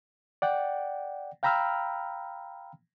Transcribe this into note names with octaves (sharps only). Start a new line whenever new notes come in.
D5 F#5 G5
F5 G5 A#5 B5 E6 F6